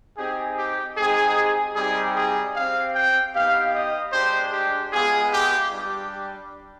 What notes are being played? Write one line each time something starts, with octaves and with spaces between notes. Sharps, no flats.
C4 D#4 G4 G#4
G4
G#3 C4 D#4 G4 G#4
G3 C4 D#4 G4 G#4
G#4
C4 G4 F5
G5
B3 D#4 G4 F5
D#5
G#3 D4 G4 C5
G4
G#3 B3 F4 G#4
G4
G3 D4 G4